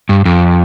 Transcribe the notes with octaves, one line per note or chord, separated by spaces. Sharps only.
G2
F2